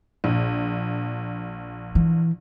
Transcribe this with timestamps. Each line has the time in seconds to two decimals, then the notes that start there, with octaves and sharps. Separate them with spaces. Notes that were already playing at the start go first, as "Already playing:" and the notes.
0.24 A#1
1.95 E3